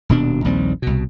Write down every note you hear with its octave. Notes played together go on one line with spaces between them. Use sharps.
D#1 B2 D4
A#1 D#2 G3 C4
C2 B2